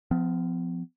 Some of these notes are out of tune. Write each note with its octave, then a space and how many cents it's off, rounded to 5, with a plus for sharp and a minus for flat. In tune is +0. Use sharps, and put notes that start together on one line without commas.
F3 +0 B3 +45